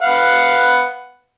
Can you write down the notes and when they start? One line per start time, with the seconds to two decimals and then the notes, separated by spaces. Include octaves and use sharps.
0.01 B4 F5 F#5